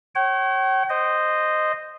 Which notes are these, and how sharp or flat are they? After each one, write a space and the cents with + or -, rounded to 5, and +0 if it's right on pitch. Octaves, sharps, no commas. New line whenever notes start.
C#5 -25 G5 -45
C5 -5 D#5 -10